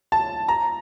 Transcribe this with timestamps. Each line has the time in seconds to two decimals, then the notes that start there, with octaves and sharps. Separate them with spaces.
0.12 A5
0.48 A#5